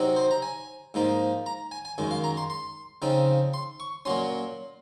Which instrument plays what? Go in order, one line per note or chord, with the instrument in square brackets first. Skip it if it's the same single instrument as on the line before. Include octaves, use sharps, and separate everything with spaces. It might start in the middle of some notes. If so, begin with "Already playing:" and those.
Already playing: [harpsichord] C3 F#3 C4 D#4
C5
A#5
G#5
G#2 F3 A#3 D#4
A#5
G#5
G#5
F#2 D#3 G#3
F5
A#5
C6
C6
C#3 F3 C4 D#4
C6
C#6
A#2 F#3 C#4 C6